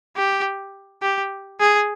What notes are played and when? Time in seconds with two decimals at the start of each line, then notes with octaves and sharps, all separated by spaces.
0.17 G4
1.02 G4
1.60 G#4